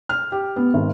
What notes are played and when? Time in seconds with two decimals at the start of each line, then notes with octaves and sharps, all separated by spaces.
0.09 F6
0.32 G4
0.56 B3
0.74 G#1